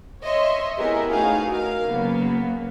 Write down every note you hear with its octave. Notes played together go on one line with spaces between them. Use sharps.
C#5 D#5 E5 C6
B3 E4 G4 G#4 A#4 B4
A3 C#4 D#4 F#4 G#4 F5
A#4 F5
C#3 F#3 A#3 B3